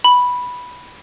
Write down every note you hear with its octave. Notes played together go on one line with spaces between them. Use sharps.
B5